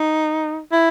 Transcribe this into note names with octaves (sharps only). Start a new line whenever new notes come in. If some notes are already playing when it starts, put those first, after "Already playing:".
Already playing: D#4
E4